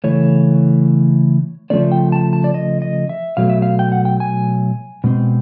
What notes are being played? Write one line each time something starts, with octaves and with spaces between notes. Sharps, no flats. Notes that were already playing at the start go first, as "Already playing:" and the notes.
C#3 E3 A3 C#5
C#3 F3 A3 C4 D5
G5
A5
A5
D5
D#5
D#5
E5
B2 F#3 A3 F5
E5
F5
G5
F#5
G5
G#5
B2 G#3 C4